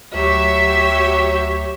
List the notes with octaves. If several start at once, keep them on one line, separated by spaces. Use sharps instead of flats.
D2 F#3 G4 C#5 E5